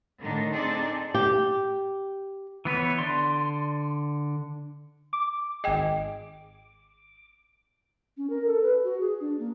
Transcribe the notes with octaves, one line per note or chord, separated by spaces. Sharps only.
A2 D3 D#3 D4 D#4
C4 D4 D#4 G#4 A4 D5
G4
E3 B3 B4 C#5
D3 D5 C6
D6
G#1 G#4 D#5 G5
C#4
A#4
A4
B4
F#4
G#4
D4
A#3